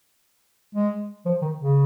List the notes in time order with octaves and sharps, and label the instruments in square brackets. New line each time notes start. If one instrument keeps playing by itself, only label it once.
[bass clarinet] G#3
F3
D#3
C#3